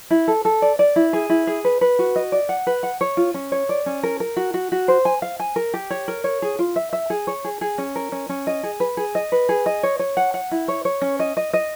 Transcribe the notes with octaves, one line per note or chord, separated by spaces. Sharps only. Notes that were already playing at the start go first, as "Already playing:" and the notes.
E4
A4
A4
D5
D5
E4
G#4
E4
G#4
B4
B4
F#4
D#5
D5
F#5
B4
F#5
C#5
F4
C#4
C#5
D5
C#4
A#4
A#4
F#4
F#4
F#4
C5
G#5
F5
G#5
A#4
G4
C#5
A#4
C#5
G#4
F4
E5
E5
G#4
C#5
G#4
G#4
C#4
A#4
C#4
C#4
D#5
G#4
B4
G#4
D#5
B4
G#4
D#5
C#5
C#5
F#5
F#5
E4
C#5
C#5
C#4
D#5
D#5
D#5